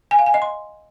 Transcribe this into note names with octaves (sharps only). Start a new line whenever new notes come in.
G#5
F5
G#5
D#5
C6